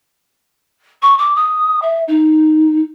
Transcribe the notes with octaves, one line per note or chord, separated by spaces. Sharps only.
C#6
D6
D#6
E5
D#4